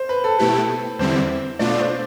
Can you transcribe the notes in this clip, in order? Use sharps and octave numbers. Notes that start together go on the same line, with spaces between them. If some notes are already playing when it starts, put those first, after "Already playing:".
Already playing: C5
B4
A4
B2 A3 E4 G4 B4
E2 D3 G3 C4 E4 C5
B2 A3 D4 F4 D5
C5